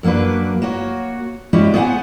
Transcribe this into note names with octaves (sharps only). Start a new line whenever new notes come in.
F#2 F#3 A#3 D4 B4
A#3 F#4 C#5
G3 G#3 C#4 E4 F#4 G4
B3 G#4 C5 E5 F#5 G#5